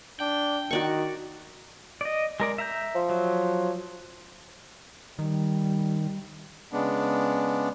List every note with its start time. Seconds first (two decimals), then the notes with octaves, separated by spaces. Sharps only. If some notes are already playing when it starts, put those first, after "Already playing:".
0.20 D4 G5
0.71 D#3 F#4 D5 C#6
2.01 D5 D#5
2.40 G#3 A#4 D5
2.58 E5 A#5 G6
2.95 F3
3.09 F#3
5.19 D#3 G3
6.73 C#3 G#3 B3 D4